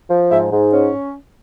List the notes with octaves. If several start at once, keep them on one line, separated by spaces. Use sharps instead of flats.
F3
G#2 E5
G#2
C#4